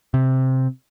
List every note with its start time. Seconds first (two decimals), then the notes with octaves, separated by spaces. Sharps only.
0.14 C3